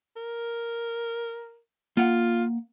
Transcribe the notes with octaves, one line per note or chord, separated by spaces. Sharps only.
A#4
A#3 F4 F#5